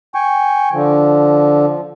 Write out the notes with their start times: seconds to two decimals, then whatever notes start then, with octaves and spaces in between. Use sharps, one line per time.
0.15 G5 G#5 C#6
0.73 D3 F3